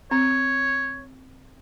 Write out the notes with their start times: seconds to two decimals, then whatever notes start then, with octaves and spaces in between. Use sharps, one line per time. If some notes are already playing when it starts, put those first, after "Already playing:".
0.11 C4 C#5